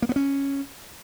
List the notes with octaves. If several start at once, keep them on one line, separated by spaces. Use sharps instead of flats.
A#3
B3
C#4